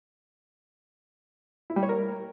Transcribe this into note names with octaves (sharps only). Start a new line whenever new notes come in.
E4
G3
C#5
A#4